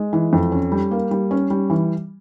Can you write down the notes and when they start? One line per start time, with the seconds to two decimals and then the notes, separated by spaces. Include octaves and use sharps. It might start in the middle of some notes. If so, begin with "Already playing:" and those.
Already playing: G#3
0.13 E3
0.33 F2
0.52 C#4
0.72 G3
0.91 A#3
1.11 G3
1.31 C#4
1.50 G3
1.70 E3